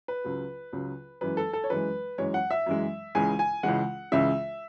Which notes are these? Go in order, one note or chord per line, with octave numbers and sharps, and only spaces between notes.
B4
C#2 C#3 F#3
C#2 C#3 F#3
F#2 E3 G#3 B4
A4
A4
C#5
F#2 E3 G#3 B4
F#2 E3 G#3 C#5
F#5
E5
F#2 E3 G#3
C#2 C#3 E3 G#3 G#5
G#5
C#2 C#3 E3 G#3 F#5
C#2 C#3 E3 G#3 E5